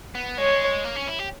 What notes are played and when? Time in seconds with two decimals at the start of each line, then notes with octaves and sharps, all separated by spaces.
0.15 B3
0.38 G#3 C#5
0.85 A#3
0.96 C#4
1.08 E4
1.19 G4